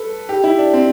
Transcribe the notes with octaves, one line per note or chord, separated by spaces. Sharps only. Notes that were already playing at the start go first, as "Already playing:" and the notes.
Already playing: A4 B4
G4
E4
D4
C4